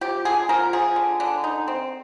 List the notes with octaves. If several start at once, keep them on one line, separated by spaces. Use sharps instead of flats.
F3 G4
D3 G#4
F3 A#4
F3 G#4
D3
D3
D#4
C4